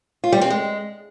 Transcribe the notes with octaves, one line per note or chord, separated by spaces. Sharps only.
F4
G3
C4
G#3